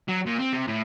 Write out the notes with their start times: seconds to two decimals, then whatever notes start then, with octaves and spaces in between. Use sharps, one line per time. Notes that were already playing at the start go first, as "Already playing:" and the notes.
0.08 F#3
0.26 A#2
0.38 C4
0.53 C3
0.67 A2